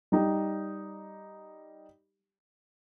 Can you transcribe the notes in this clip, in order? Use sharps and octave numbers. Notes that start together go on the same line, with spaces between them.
G3 D#4 G4